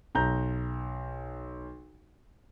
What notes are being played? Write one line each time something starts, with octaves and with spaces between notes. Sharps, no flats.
B1 A#5 G6